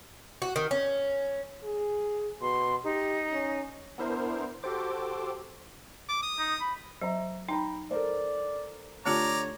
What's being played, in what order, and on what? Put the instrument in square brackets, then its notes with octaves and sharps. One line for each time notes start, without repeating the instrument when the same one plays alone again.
[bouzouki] F#4
D#3
C#4
[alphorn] G#4
[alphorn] B2 [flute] C6
[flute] D#4 [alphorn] G4
[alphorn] C#4
[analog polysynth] B3 D4 E4 A#4 C5
F#4 G4 A4 C5 D6
[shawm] D6
D#6
[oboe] D#4
B5
[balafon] F#3 [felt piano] C5 E5 A#5
[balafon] D#4 [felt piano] G5 A#5 B5
[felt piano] A4 A#4 C5 [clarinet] D5
[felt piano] D3 A5 [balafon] A3 F4 G4 [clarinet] C#5 [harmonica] D5 A#5